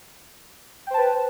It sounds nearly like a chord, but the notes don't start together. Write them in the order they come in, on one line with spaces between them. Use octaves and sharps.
G5 C5 A5 B4